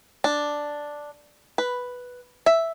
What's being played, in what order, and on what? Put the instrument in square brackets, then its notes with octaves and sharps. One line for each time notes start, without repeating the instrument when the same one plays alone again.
[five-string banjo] D4
B4
E5